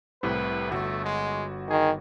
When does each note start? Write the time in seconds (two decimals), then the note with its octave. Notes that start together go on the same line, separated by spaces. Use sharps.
0.23 C2 A2 C3 B4
0.71 G1 A3 F#4
1.04 G#3
1.70 D#3 G#4